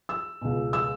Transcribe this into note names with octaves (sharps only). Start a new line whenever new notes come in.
E6
C#2 B2
E6